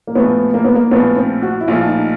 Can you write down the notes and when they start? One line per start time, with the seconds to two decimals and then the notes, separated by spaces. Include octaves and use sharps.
0.07 A#3
0.15 A#1 A2 F3 A3 B3
0.54 A#3
0.64 B3
0.75 A#3
0.91 A#1 A2 F3 A3 B3
1.16 C4
1.42 F#4
1.61 E4
1.68 A#1 A2 F3 A3 F4
1.86 D#4